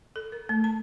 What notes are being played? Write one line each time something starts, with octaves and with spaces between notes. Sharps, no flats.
A4
A#4
A3
A5